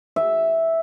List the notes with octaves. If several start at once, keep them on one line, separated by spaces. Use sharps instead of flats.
E5